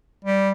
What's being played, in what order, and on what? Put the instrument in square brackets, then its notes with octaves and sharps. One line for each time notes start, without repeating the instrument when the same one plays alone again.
[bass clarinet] G3